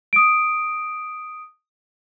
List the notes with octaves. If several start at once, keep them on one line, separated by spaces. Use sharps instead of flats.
D#6 D7